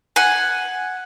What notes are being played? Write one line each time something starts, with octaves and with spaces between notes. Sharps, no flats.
F#5 G#5